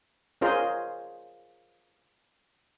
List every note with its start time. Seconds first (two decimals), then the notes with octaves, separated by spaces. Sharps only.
0.41 C#4 F4 G#4 A#4 C5 D#5